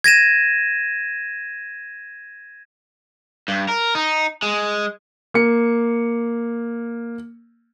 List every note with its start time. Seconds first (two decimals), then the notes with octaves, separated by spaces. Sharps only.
0.04 G#6 A#6 D#7 E7
3.48 G2
3.69 A#4
3.95 D#4
4.42 G#3
5.34 A#3 C#7